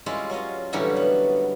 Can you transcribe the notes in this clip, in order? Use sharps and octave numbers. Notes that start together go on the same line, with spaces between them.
G3 G#3 C#4 E4 F4
F#3 C#4 F4 D#5
A2 D3 E3 F#3 G3 C#4
B3